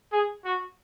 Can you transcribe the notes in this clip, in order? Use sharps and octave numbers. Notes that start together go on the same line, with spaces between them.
G#4
F#4